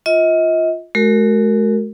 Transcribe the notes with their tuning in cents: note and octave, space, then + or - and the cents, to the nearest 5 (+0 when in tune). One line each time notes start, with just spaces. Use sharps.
F4 +0 D#5 +40
G#3 +40 F#4 +15 A#4 -20